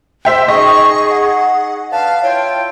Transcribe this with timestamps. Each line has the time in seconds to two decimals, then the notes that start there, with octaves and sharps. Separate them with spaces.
0.25 C5 E5 G5
0.48 D#4 G#4 D#5 C#6
1.10 F#5
1.92 D3 B4 F5 A5
2.23 E4 F4 C#5 G5